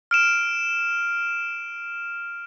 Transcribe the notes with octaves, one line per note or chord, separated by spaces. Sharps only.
F6 D7 E7